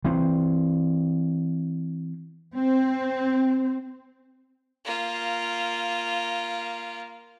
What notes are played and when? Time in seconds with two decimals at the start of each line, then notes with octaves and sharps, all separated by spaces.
0.05 E3 C4
2.55 C4
4.85 A#3 F4